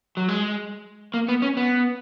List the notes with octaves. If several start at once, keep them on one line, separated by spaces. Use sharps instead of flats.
F#3
G#3
A#3
B3
C#4
B3